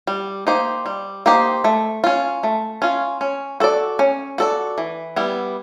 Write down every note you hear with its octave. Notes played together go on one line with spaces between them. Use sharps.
G3
A#3 D#4 G4 C5
G3
A#3 D#4 G4 C5
A3
C#4 F4
A3
C#4 F4
C#4
F#4 A4 D5
C#4
F#4 A4 D5
E3
G3 B3 E4